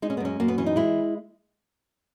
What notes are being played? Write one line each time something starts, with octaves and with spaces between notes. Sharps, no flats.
G#3 D#4
C#4
B3
F#2 C#4
F#2 A#3
B3
E3 C#4
D#4
G#3 E4